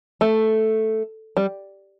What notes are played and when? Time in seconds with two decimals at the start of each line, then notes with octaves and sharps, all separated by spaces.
0.21 A3
1.37 G3